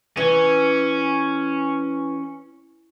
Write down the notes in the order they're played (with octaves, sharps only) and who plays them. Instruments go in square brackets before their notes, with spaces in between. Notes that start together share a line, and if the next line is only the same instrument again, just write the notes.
[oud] E3 [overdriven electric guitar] C#4